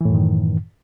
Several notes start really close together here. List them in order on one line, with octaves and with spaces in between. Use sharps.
E3 A2 F#2 D#3